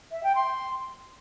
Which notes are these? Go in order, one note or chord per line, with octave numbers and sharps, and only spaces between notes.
E5
G5
C6